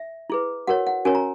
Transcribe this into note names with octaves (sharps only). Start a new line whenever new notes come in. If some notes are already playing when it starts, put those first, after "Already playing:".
Already playing: E5
E4 G#4 B4
F#4 A#4 C#5 F#5
F#5
C#4 F#4 A#4 C#5 G#5
A#5